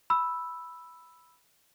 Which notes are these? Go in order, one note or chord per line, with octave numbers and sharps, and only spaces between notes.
B5 E6